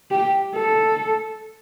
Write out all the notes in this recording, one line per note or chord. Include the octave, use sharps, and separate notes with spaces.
G4
A4